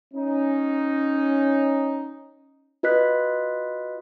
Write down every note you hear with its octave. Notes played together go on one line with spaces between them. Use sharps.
C#4 D#4
F4 F#4 B4 D#5 F#6 B6